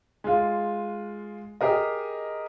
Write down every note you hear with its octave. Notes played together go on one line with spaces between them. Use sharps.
G#3 F4
G4 G#4 A#4 D#5